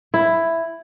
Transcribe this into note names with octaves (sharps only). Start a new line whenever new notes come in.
E4